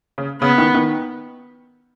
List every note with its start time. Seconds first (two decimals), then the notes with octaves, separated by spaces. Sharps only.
0.18 C#3
0.42 C#3 B3
0.58 D#3
0.75 D#3